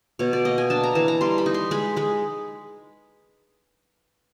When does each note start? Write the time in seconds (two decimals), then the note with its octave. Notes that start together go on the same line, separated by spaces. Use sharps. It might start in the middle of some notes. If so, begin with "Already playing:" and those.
0.19 B2 C#5
0.33 D5
0.45 A#3 D#5
0.58 G#5
0.70 D4 A5
0.84 A#5
0.95 E3 A5
1.08 A#5
1.21 G3 C6
1.38 B5
1.46 D#4
1.54 C6
1.71 G#3 B5
1.96 G#3 B5